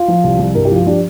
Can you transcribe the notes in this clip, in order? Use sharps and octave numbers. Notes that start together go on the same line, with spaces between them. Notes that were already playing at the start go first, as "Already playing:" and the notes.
Already playing: F4
F3
C2
C2
G2 A#4
G4
F3 F4
F3 D4 G4